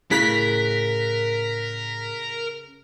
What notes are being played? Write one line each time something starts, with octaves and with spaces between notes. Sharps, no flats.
A2 C#3 A#4 F#6 B6